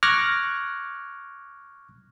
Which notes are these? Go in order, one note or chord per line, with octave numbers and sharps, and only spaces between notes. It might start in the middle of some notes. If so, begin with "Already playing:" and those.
C#6 D6 F6 F#6 G#6 A#6